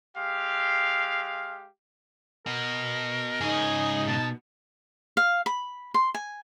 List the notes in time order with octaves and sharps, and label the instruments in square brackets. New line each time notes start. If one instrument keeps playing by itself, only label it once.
[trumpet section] G#3 G4 F5
[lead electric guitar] B2 [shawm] A#4
[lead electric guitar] G#2 C#3 [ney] D#4 [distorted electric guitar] G#4
[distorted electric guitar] B2 [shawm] A5
[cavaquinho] F5
B5
C6
G#5